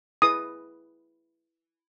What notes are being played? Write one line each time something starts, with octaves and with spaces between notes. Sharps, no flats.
E4 G#4 B4 D#6